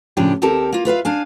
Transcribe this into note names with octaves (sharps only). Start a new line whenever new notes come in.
A2 C#3 F3 D4 G4
D#2 C4 G4 A4 A#4 A5
A#3 F4
F4 B4 E5 F5
D4 F5 G#5